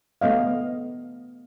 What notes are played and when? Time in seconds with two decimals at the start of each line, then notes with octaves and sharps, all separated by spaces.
0.21 A3 B3 D#5 F5